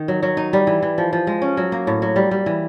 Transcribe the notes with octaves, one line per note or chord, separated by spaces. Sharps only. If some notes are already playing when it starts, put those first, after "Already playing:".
Already playing: D#3
F#3
F#3
D#4
G3
E3
E3
F3
F3
G#3
C#4
F#3
A#3
A2
F#3
G3
G3
E3